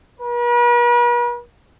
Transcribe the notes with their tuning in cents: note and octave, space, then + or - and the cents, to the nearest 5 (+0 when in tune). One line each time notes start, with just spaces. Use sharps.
B4 -45